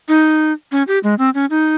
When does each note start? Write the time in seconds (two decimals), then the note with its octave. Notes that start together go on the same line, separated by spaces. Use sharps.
0.08 D#4
0.72 C#4
0.88 G4
1.04 G#3
1.19 C4
1.35 C#4
1.50 D#4